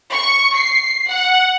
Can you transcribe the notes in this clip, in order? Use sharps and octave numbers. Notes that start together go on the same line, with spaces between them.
C#6
C7
F#5